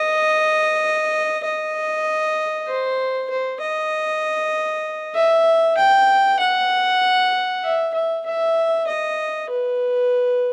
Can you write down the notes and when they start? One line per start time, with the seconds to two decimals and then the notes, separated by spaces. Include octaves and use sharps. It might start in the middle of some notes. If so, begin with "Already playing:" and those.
Already playing: D#5
1.44 D#5
2.68 C5
3.30 C5
3.61 D#5
5.15 E5
5.78 G5
6.40 F#5
7.64 E5
7.94 E5
8.26 E5
8.87 D#5
9.50 B4